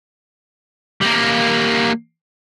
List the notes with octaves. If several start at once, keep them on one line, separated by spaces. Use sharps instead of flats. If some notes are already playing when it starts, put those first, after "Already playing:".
G3 A#3